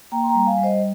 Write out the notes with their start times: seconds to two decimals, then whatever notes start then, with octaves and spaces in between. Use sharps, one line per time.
0.12 A#3 G5 A#5
0.24 C6
0.29 G5 A#5
0.35 G3
0.46 F5 G#5
0.58 G3
0.63 C5 D#5